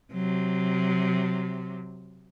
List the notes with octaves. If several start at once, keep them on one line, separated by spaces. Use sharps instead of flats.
C3 F#3